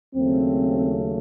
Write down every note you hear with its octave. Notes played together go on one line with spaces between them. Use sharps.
D#2 C#3 F#3 A3 C4